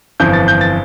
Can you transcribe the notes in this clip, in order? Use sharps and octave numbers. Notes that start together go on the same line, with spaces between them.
G1 F2 E3 G6
A6
G6
A6